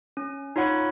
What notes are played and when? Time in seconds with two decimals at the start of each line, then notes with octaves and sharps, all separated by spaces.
0.17 C#4
0.56 D#4 F4 C#5 F#5 B5